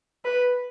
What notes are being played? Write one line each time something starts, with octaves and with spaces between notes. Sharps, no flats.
B4